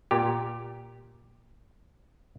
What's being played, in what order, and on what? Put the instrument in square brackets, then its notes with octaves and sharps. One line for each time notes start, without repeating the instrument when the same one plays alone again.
[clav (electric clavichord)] A#2 G4